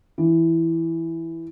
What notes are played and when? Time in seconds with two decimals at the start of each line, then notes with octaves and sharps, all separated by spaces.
0.18 E3